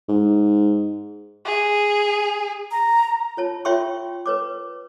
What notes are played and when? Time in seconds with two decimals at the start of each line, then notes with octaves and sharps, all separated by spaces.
0.09 G#2
1.45 G#4
2.71 A#5
3.37 F4 C#5 A5
3.65 F4 C#5 E5 G5 C6 C#6
4.26 B4 C#5 D6